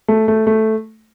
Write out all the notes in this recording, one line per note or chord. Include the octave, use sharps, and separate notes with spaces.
A3
A3
A3